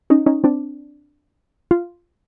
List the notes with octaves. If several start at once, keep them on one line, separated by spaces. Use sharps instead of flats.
C#4 D#4
C#4 D#4
C4 D4
F4